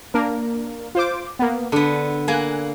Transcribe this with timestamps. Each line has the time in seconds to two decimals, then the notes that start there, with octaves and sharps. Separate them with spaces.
0.14 A#3 D4 A#4
0.95 F4 C5 D6
1.39 A#3 B3
1.72 D3 B3 D4
2.28 A#3 G#5 F#6